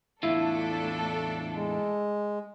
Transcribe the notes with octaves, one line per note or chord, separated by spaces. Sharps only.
E2 A2 A3 D4 E4 F4 A4
G#3